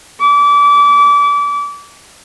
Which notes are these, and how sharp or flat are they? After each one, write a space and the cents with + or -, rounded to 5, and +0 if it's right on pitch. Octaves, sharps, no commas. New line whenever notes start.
D6 -30